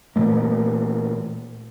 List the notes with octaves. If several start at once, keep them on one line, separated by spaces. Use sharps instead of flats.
A#2 E3 A3 A#3